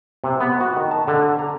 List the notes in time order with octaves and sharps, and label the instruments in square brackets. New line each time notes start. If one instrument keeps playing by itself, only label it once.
[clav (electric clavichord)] C3
B3
F#4
D#3
A5
D3
A#5